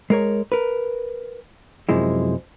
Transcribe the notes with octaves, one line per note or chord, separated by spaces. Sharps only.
G#3 A#4 C#5
A#4 B4
F#2 C3 F3 G#3 E4